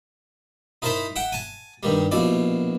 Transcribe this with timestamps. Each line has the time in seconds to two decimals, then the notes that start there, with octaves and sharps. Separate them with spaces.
0.82 D#4 E4 A#4 C5 A5 B5
1.16 E5 F#5 G5
1.32 G#5 A5
1.83 G2 D#3 G3
2.11 A#1 B2 E4 D5